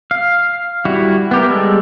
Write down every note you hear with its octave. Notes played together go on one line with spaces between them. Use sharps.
F5
G3 E4 F#4
B3 G4 A#4
G3 G#3 A4